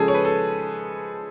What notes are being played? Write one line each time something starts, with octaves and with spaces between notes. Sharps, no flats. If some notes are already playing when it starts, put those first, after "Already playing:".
Already playing: C#3 F3 G#3 C#4 G#4 A4
C#5
B4
A4